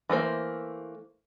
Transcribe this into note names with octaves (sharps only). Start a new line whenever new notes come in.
E3 A3 A#3 C5